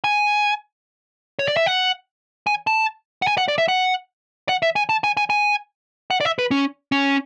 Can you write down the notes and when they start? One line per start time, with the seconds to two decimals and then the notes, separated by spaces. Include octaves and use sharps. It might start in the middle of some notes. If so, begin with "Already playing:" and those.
0.04 G#5
1.39 C#5
1.48 D5
1.57 E5
1.66 F#5
2.47 G#5
2.67 A5
3.22 F#5
3.27 G#5
3.38 F#5
3.48 D5
3.58 E5
3.68 F#5
4.49 F#5
4.62 E5
4.76 G#5
4.89 A5
5.04 G#5
5.17 G#5
5.30 G#5
6.10 F#5
6.21 D5
6.25 E5
6.39 B4
6.51 C#4
6.92 C#4